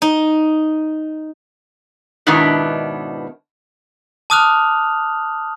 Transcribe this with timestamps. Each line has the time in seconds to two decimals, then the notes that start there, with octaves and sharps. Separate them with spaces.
0.02 D#4
2.27 G#2 B2 D#3 B3 D4 E4
4.30 A5 D6 D#6 F6 F#6 F7